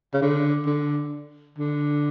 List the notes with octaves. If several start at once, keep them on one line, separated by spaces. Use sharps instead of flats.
C#3
D3
D3
D3